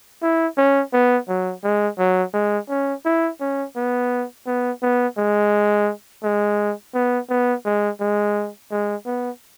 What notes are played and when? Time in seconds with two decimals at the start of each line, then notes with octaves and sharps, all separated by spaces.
0.22 E4
0.58 C#4
0.93 B3
1.28 F#3
1.64 G#3
1.99 F#3
2.34 G#3
2.69 C#4
3.05 E4
3.41 C#4
3.76 B3
4.47 B3
4.82 B3
5.18 G#3
6.23 G#3
6.94 B3
7.30 B3
7.65 G#3
8.00 G#3
8.71 G#3
9.06 B3